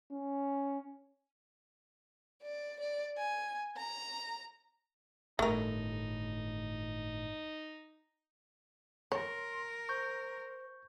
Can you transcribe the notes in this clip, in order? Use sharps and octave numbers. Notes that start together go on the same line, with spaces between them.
C#4
D5
D5
G#5
A#5
G1 A2 A3 D#4 A#4
A#4 C#5 C6
C5 C#6 G6